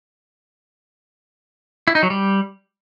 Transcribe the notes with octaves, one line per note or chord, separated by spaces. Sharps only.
E4
D#4
F#3
G3